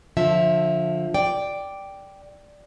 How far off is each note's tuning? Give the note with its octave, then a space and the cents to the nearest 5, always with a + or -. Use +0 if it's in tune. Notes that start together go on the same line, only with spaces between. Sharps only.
D3 +0 F3 +20 E5 -5
D5 +0 G5 +0